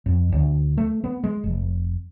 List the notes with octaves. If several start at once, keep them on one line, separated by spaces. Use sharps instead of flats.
F2
D2
A3
B3
G#3
F1